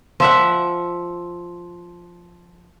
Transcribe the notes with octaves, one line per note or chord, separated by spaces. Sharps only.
F3 E5 F#5